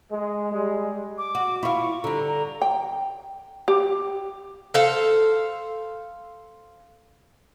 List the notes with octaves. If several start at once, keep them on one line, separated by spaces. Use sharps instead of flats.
G#3
G3 G#3
D6
F#4
E4 F4 C#6
D3 G3 A#5
A#5
G5
G4
A4 C5 F5